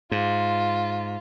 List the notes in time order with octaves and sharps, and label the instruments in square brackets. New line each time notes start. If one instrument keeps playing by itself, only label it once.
[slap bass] G#2 [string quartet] F4